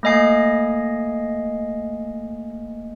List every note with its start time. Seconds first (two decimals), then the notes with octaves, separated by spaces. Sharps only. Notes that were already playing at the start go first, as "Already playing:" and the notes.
0.03 A3 A#3 D#5 G#5 C7